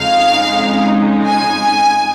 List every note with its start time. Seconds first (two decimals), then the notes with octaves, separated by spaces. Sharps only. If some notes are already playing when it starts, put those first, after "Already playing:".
Already playing: F2 C#3 G#3 D#4 F5
1.25 G#5